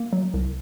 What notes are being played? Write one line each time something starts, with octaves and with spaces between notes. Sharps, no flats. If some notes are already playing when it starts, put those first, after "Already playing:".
Already playing: A#3
F#3
C2